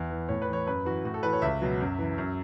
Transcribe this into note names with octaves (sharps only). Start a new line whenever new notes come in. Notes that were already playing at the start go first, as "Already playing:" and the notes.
Already playing: E2
E3
A2 C#5
B4
E3 C#5
F#2 B4
E3 F#4
A2 F#4
A4
E3 B4
C#5
C#2 E5
B2 F#3
F#2
E3
F#2